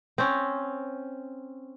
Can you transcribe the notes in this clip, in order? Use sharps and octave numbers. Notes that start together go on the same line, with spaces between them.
C4 C#4